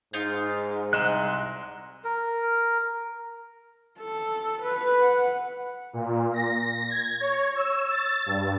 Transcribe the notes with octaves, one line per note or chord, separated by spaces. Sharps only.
G#2 D#4 F4 F5
C2 D#5 A#5 C6 F#6 E7
A#4
A4
B4
F#5
A#2
A#6
G#6
C#5
E6
A6
G2